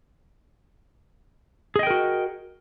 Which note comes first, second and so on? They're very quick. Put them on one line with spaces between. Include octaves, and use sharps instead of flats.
G#4 D#5 G5 A#4 F#4